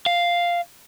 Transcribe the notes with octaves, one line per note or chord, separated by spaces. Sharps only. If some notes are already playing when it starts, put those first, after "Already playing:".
F5